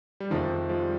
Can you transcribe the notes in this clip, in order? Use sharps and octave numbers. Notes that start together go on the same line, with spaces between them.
G3
F2 C3 D#3 F3 G#3
F3 G#3
G3